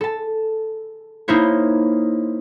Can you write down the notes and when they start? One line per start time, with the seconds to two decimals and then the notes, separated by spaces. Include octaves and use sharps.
0.01 A4 A5
1.28 A#3 D#4 E4 C5 C#5